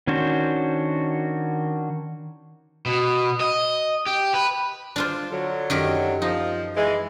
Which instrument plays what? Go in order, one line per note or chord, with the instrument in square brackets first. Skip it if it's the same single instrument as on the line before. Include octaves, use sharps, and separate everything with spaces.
[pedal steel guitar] D#3 C#4 D4 F#4 C5
[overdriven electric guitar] B2
D#5
G4
B4
[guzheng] D4 F4 C5
[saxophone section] D3 F#3
[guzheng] F#2 D#3 G4
[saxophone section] F3 [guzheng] D#4
[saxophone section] E3 G#3